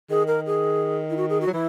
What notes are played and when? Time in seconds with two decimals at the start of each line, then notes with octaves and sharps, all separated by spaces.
0.10 D#3 G#4
0.28 A#4
0.46 G#4
1.10 E4
1.17 F#4
1.30 G#4
1.41 F#4
1.47 F#3
1.53 E3 E4